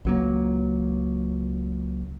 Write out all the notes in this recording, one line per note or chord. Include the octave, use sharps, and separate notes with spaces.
C#2 F#3 A#3